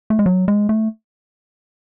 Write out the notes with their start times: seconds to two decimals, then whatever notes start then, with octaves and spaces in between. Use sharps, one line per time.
0.10 A3
0.19 G#3
0.26 F#3
0.48 G#3
0.69 A3